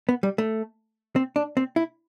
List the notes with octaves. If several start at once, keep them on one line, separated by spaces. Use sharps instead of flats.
B3
G3
A3
C4
D4
C4
E4